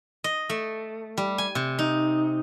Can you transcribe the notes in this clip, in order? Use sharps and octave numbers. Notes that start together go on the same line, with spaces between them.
D#5
A3
G3
G#5
C3
D#4